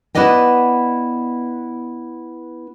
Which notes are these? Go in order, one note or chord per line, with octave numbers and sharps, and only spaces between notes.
B3 E4 B4 D5 D#5 G5